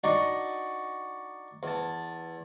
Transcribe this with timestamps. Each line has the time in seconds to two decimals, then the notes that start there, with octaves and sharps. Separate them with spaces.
0.04 D4 D#4 F#4 D5 D#5
1.63 E2 A5